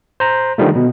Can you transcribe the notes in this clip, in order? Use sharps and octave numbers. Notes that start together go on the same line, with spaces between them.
C5 A#5
D3 D#3 F3 G3 A3
B2